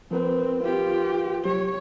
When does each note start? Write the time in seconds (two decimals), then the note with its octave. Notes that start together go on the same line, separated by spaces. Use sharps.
0.11 F3 C4 A#4 B4
0.63 F4 G4
1.45 C2 F#3 G4 C#5